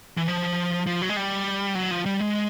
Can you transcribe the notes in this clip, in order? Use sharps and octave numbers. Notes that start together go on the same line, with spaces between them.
E3
F3
F3
F#3
G#3
G3
F#3
F3
G3
G#3